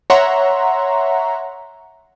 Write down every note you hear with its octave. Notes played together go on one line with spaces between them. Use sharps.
C#5 E5 F#5 A#5 C6 C#6